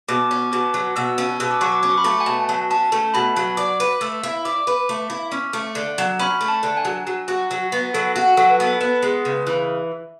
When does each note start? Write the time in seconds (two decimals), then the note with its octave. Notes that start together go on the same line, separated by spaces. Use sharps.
0.08 B2 D6
0.31 C#4
0.52 B2 D6
0.74 F#3
0.96 B2 E6
1.18 C#4
1.40 B2 E6
1.51 D6
1.61 F#3 C#6
1.72 D6
1.83 C#4 D6
1.90 C#6
1.98 B5
2.04 A3 C#6
2.20 G#5
2.26 B2 A5
2.49 F#3
2.70 C#4 A5
2.92 A3
3.14 B2 B5
3.36 F#3
3.57 D5 D6
3.80 B4
4.01 A3 E6
4.23 E4
4.45 D5 D6
4.67 B4
4.89 A3
5.10 E4
5.32 C#4
5.53 A3
5.75 D3
5.98 F#3
6.19 C#4 B5
6.41 A3
6.48 A5
6.63 D3
6.77 G#5
6.85 F#3
7.07 F#3
7.28 F#4
7.51 F#3
7.72 B3
7.94 F#3 A4
8.16 F#4
8.37 F#3 A4
8.50 B4
8.60 B3 A4
8.81 B3 B4
9.03 G#3
9.25 C#3
9.47 E3